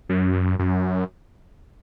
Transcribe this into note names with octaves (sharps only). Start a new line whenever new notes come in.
F#2
F#2